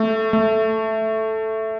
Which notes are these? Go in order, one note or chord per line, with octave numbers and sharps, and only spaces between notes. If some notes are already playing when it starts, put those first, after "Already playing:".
Already playing: A3
A3